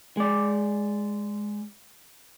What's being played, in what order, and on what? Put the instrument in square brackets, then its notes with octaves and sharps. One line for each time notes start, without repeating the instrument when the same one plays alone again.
[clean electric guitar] G#3 D5